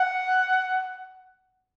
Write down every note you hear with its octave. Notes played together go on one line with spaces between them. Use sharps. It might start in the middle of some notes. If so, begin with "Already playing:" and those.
Already playing: F#5